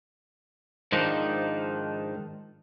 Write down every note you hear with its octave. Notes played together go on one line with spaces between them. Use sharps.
G#2 D#3 F3 D4 D#4